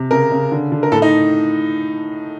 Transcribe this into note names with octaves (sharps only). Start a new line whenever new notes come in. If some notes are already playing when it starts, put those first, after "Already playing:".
Already playing: C3
C#3 A#4
C#3
D3
D3
A#4
A2 A4
D#4